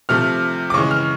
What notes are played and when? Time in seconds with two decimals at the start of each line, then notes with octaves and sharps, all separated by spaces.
0.09 C3 F3 A3 F6
0.70 D6
0.74 C#3 E3 G#3 C#6
0.91 F6